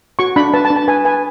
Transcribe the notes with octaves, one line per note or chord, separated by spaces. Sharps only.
F#4 C#6
D4 B5
B4 A5
A5
D4
A5
B4 G#5
B4 G#5